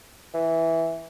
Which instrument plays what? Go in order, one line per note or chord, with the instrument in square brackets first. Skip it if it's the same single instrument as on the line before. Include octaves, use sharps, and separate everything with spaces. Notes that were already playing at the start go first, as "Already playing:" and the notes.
[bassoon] E3